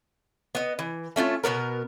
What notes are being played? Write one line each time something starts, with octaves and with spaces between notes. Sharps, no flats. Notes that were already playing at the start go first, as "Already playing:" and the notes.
B3 D#5
E3
A3 C#4 D#4 F4
B2 D3 B3 A#4